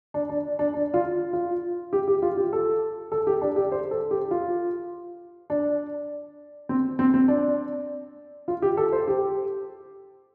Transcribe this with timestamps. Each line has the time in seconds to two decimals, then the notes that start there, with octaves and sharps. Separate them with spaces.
0.14 D4
0.29 D4
0.59 D4
0.74 D4
0.94 F4
1.33 F4
1.93 G4
2.08 G4
2.22 F4
2.37 G4
2.53 A4
3.12 A4
3.27 G4
3.41 D4
3.56 G4
3.72 C5
3.91 A4
4.11 G4
4.31 F4
5.50 D4
6.69 C4
6.99 C4
7.14 C4
7.28 D4
8.48 F4
8.62 G4
8.77 A4
8.92 C5
9.08 G4